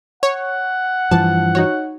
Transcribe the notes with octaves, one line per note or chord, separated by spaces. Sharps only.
C#5 F#5
G2 E3 F3 A5
D#4 F#4 C#5